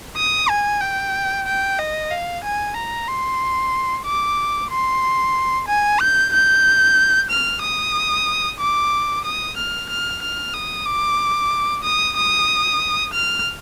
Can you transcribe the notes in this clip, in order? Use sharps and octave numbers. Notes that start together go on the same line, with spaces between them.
D#6
G#5
G5
G5
D#5
F5
G#5
A#5
C6
D6
C6
G#5
G6
G6
F6
D#6
D6
D#6
F6
F6
F6
D#6
D6
D#6
D#6
F6